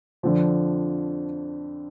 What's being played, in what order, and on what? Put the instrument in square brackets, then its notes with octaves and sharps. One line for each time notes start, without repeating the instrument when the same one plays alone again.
[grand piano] F2 D3 F3